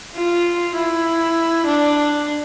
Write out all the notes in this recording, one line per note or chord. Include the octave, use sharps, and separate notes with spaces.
F4
E4
D4